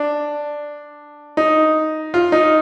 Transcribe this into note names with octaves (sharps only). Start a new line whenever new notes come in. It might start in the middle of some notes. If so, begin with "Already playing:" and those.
Already playing: D4
D#4
F4
D#4